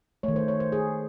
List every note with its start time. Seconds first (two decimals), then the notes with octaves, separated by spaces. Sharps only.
0.23 D#3 A3 C#5
0.36 C5
0.48 C#5
0.60 C5
0.72 G#4